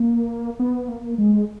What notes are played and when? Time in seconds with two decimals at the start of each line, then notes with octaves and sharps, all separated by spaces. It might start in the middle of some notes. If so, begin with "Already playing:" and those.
Already playing: A#3
0.59 B3
0.88 A#3
1.18 G#3